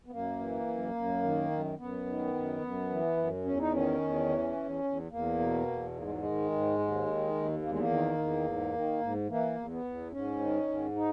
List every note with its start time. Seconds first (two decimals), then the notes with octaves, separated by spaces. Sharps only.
0.06 B3
0.11 F#2 A#3
0.39 E3
0.67 F#2
0.95 F#2
1.23 D#3
1.51 F#2
1.78 F#2 B3
2.06 D#3
2.34 F#2
2.61 F#2
2.90 E3
3.17 F#2
3.45 E2 C#4
3.59 D#4
3.72 D#3 C#4
4.01 E2
4.29 E3
4.56 E2
4.84 E2
5.11 E2 A#3
5.39 B2
5.67 E2
5.95 G#2 A#3
6.03 G#3
6.11 F#3
6.17 G#3
6.23 D#3
6.51 G#2
6.79 D#2
7.06 D#3
7.34 D#2
7.62 E2 A#3
7.70 G#3
7.78 A#3
7.90 D#3
8.18 E2
8.45 G#2
8.74 D#3
9.01 G#2
9.28 E3 A#3
9.56 E2
9.71 B3
9.84 E2
10.12 G#2 C#4
10.39 D#3
10.68 G#2
10.96 D#4